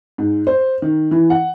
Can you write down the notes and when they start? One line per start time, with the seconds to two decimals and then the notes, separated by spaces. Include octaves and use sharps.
0.18 G#2
0.47 C5
0.82 D#3
1.11 E3
1.30 F#5